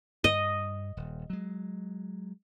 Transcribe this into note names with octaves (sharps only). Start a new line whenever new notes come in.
G2 D#5
D#1
F#3 G#3